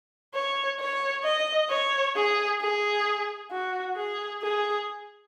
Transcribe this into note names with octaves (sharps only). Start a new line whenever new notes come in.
C#5
C#5
D#5
C#5
G#4
G#4
F#4
G#4
G#4